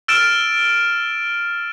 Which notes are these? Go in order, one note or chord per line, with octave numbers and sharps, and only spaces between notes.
E6 F6 A6 D7 E7